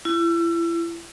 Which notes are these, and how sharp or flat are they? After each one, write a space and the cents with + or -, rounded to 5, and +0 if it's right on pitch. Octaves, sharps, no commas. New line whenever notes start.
E4 +35